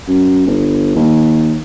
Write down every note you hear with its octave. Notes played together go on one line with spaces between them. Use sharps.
F#2
G1
D#2